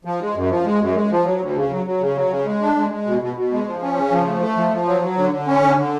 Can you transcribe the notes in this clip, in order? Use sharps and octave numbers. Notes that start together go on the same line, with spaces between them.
F3
G#3
F#2
F3
G#3
F#2
G#3
F3
F#3
D2
C#3
F#3
F#3
C#3
F#3
C#3
G#3
D4
G#3
G#3
B2
B2
B2
G#3
F3
C#4
C#3
F3
A3
A3
F3
F3
F#3
F#3
D3
D3
C#4
D3
D3